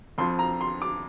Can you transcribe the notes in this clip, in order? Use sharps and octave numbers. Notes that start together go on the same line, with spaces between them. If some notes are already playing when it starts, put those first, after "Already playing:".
F2 F3 C4 C6
A#5
C6
D6